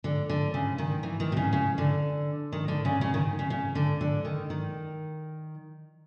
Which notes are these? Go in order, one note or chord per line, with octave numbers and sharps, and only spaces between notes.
D3
D3
C#3
D#3
E3
D#3
C3
C#3
C#3
D3
D#3
D3
C#3
C#3
D#3
C#3
C#3
D3
D3
D#3
D#3